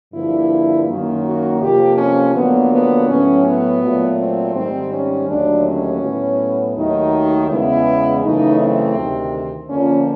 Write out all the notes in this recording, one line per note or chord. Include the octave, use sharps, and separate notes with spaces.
G2 D3 F3 A#3 E4
F#2 D#3 F#3 A#3
F#4
F2 C3 F3 A#3 G4
C#4
F2 D3 F#3 A#3 B3
B3
A2 F#3 B3 C#4
B3
A#2 F#3 A3
C4
G#2 D#3 G3 C4
C#4
D#2 D3 F#3 A3 D4
C#4
A2 F#3 B3
D#2 D#3 F#3 A3 D#4
E2 C#3 E3 G#3 B3 E4
F#2 C#3 E3 A3 D#4
C4
D2 C3 D#3
F2 D3 F3 A#3 C#4